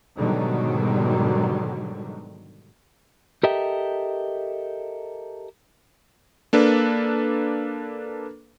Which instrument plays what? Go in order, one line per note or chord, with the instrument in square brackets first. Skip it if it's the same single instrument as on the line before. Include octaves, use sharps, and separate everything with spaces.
[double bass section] G#2 B2 D3 D#3 F#3 G3
[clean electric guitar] G4 A4 A#4 D#5 E5 G5
[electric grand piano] A#3 D4 A4 B4